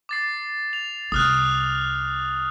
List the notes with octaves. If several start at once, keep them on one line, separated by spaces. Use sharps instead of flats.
D6 A6 C7
F7
C2 D#6 F6 F#6